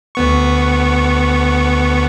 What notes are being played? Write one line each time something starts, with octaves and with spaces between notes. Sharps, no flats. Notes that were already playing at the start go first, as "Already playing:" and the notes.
D2 B3 C#6